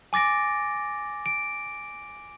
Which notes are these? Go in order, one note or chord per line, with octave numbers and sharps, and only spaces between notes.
G#5 D6 A6 A#6 D7
D7